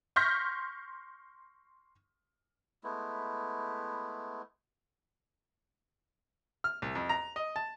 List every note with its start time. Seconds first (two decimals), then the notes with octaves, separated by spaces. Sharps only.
0.16 C6 C#6 F6 G6 A#6 B6
2.84 G#3 A3 B3 E4
6.64 F6
6.82 C2
6.95 F2
7.09 A#5
7.36 D#5
7.56 A5